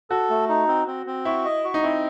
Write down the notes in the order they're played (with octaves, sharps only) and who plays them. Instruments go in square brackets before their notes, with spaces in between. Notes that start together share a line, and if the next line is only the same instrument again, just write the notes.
[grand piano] F#4 [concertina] A4
[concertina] A3
D#4
C4
C4
C4
[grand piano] E4 [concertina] F#4
[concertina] D#5
F#4
[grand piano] D#4
[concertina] C4 [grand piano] E4